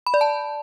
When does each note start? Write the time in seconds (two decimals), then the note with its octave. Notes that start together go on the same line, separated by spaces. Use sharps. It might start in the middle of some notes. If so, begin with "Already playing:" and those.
0.06 B5
0.14 D5
0.21 A5